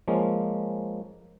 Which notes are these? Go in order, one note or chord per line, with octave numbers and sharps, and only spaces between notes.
F3 G#3 A#3 C#4